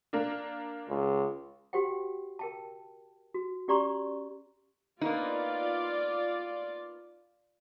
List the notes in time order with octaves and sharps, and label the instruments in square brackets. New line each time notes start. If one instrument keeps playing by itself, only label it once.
[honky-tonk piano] A#3 D4
[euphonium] C#2
[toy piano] F#4 G4 C5 F#5 G5
A#4 G5 A5
F#4
C#4 G4 D5 A#5 C6 C#6
[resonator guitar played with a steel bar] A#3 B3 D#4 [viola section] F4 D5